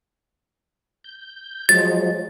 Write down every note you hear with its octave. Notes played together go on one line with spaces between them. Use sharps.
G6
F3 F#3 G#3 A6